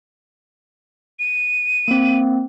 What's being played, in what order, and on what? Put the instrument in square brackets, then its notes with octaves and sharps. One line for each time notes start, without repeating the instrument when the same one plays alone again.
[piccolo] D#7
[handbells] A#3 C4